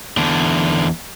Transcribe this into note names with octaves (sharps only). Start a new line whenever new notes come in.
E2 D3